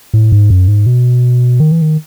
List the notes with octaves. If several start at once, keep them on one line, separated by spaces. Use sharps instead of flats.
A2
G#2
F#2
G#2
B2
D#3
E3
D#3